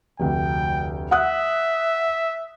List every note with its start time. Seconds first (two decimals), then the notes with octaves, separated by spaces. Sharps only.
0.20 F1 D2 G5
1.11 E5 F#5 D#6 F#6